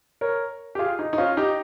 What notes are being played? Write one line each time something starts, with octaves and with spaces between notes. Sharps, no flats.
A#4 C#5
G4
F4 G#4
D#4
D#4
C#4 F4
D#4 G4